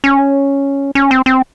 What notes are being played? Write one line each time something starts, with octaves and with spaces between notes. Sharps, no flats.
C#4
C#4
C4
C4